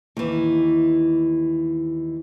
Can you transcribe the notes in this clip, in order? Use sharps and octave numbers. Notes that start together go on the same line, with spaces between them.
D#2 E3